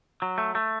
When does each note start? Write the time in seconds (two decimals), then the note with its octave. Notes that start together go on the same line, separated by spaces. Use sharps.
0.22 F#3
0.38 A3
0.55 A3